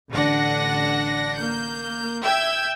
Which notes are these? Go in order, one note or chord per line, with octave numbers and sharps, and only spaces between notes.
A1 D3 D4 F#5 A#6
A#3 G6
E5 G5 E6 G6 G#6